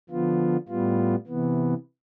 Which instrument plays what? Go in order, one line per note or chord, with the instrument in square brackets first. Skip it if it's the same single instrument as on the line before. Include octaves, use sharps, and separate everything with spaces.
[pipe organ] D3 F3 B3 F4
A2 G3 B3 F4
C3 E3 B3